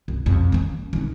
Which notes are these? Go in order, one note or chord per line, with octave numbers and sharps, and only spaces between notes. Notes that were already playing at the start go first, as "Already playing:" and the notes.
C2
F2 C3
A#3 C#4
D#2 D#4